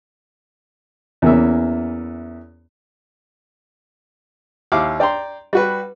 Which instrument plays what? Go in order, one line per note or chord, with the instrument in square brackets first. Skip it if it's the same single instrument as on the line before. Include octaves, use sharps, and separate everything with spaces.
[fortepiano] E2 E3 A#3 B3 C#4 E5
D#2 E4 F5 D6
D5 G5 A#5 C6
G3 F#4 B4